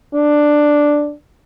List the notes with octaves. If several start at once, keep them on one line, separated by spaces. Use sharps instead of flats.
D4